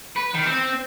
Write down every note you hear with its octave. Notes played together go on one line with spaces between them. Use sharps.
B4
D#3
C4